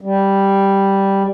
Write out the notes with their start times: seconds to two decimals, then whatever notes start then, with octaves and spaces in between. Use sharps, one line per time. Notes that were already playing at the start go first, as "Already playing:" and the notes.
0.01 G3